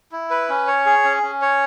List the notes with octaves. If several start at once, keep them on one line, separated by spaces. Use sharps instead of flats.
E4
B4
C#4
C#5
G#4
C#4
C#4
C#5